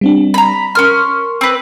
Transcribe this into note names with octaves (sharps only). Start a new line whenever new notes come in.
G3 C4 D4
A#5 B5
C#4 A#4 C6 F6
C4 B4